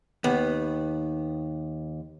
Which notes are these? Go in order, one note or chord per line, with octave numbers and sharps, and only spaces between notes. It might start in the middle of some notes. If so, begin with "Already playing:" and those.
D#2 B3